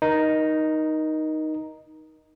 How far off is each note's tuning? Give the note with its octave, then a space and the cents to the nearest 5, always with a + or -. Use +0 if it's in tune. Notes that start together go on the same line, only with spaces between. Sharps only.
D#4 +0 A#4 +30